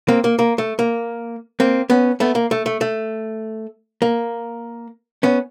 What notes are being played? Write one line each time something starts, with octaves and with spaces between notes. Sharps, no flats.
A#3 C4
A#3
A#3
A3
A#3
A#3 C4
B3 C#4
A3 B3
A#3
A3
A3
A3
A#3
B3 C#4